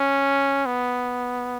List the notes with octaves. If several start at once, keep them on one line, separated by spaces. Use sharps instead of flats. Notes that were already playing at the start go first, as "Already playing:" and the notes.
Already playing: C#4
B3